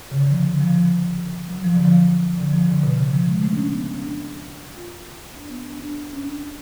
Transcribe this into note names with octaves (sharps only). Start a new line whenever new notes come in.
C#3
D3
F3
D3
F3
F3
F#3
F3
D3
F3
D3
F3
D3
B2
C#3
F3
G#3
A3
D4
C#4
B3
C#4
D4
F4
D4
B3
D4
D4
C#4
D4